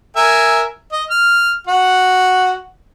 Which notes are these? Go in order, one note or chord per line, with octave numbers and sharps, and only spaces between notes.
A#4 E5 G#5
D#5
F6
F#4 F#5